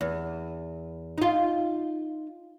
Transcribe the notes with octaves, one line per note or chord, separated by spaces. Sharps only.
E2
D#4 F4